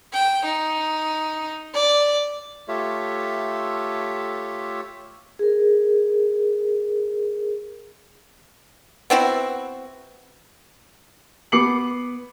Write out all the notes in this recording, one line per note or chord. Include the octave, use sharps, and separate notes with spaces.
G5
D#4
D5
A3 F4 G4 A4 C#5 E5
G#4 A#4
B3 C4 E4 F#4
B3 D6 C7 C#7 F#7